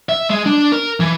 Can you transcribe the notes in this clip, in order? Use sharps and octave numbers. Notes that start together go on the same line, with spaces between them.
E5
G#3
D4
A#4
E3